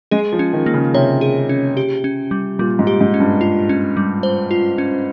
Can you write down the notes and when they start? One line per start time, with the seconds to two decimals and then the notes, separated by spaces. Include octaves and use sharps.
0.11 G#3 G#4
0.33 F3
0.39 C#4
0.53 D#3
0.66 A#3
0.74 C#3
0.94 C3 C#5
1.21 G#4
1.49 C#4
1.77 G4
2.04 C#4
2.31 G3
2.59 A#2 G3
2.79 G#2
2.87 G4
3.01 G#2
3.14 C#4
3.20 G2
3.41 F4
3.69 C#4
3.97 G3
4.23 C5
4.51 F4
4.78 C#4